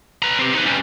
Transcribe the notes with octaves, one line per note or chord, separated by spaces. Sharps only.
B4 A#5
C4 G4
D#4 B4
G3 C#4